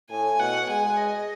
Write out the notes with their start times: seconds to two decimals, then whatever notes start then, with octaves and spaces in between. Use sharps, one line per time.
0.10 A2 G#5
0.39 B2 F#5
0.68 G#3 G#5
0.97 D#5